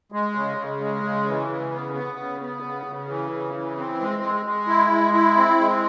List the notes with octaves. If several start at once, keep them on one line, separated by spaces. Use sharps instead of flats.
G#3
C#3
C#3
G#3
C#3
E3
C#3
B3
B3
C#3
B3
C#3
C#3
E3
C#3
E3
C4
G#3
G#3
G#3
E4
G#3
E4
C4
G#3